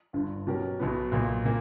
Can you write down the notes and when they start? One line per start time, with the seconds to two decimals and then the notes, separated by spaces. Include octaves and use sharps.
0.13 G1 G2 D3
0.47 B2 F#3 C#4 G4 A#4
0.80 B1 B2 F#3 B3
1.12 B1 A#2 A#3
1.45 A#2 A#3